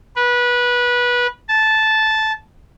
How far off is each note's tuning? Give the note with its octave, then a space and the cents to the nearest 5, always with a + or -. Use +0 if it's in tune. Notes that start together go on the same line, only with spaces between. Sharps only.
B4 -20
A5 -10